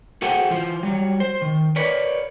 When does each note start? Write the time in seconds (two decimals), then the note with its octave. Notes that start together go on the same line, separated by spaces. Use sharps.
0.22 F#4 G#4 A4 C5 F#5 G5
0.50 E3 F4 C5
0.83 F#3 G3
1.20 C5
1.42 D#3
1.76 A#4 B4 C#5 D5